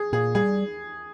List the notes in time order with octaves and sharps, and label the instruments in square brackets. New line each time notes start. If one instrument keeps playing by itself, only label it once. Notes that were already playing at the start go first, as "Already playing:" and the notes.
Already playing: [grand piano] G#4
[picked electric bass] A#2 [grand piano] G#4
[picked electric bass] G3 [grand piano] G#4